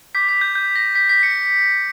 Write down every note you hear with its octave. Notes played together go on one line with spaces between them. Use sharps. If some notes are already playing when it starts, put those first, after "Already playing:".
D6 G6 B6
B6
G6
G6
A#6
B6
B6
C#7